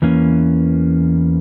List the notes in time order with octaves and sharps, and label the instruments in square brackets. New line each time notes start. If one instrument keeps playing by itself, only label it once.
[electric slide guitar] E2 E3 A#3 C#4